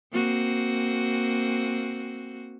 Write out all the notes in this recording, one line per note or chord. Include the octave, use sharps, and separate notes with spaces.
A#3 C4 F#4